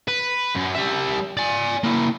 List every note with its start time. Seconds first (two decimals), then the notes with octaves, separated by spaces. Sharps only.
0.08 B4
0.55 F#2
0.75 G3 E5
1.37 D5 G#5
1.84 A#3 E4